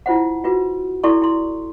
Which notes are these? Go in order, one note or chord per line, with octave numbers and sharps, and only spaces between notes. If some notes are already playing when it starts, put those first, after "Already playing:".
E4 F4 C5 F#5
F4 F#4 B4
E4 A4 D5 C6 C#6
E4 C6